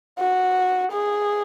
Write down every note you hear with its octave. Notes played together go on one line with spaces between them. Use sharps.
F#4
G#4